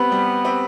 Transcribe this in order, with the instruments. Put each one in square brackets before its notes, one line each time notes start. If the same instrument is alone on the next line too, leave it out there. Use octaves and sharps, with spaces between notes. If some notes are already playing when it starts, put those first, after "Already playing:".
Already playing: [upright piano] G3 C4 G4 B4 [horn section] B3
[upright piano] G3
C4 G4 B4